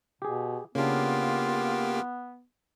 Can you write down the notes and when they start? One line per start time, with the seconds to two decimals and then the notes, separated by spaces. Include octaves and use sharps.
0.22 B2 G4 G#4
0.75 C#3 A#3 B3 D4 F4 G4